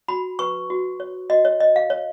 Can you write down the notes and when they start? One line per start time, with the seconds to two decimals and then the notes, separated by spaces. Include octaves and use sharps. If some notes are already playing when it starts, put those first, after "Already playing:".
0.08 F#4 B5
0.39 B4 C#6
0.70 F#4
1.00 C#5
1.30 F#4 D#5
1.45 C#5
1.60 C#5 D#5
1.76 F5
1.90 C#5